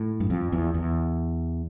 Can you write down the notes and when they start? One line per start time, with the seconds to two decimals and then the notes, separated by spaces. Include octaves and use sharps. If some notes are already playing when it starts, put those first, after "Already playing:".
Already playing: A2
0.20 G2
0.30 F2
0.52 E2
0.74 E2